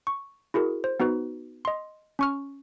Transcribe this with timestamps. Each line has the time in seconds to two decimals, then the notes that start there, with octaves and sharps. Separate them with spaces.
0.07 C#6
0.54 E4 F#4 G#4 A#4
0.84 C5
1.00 B3 D#4 F#4 B4
1.65 D#5 C6
2.19 C#4 C#6 F6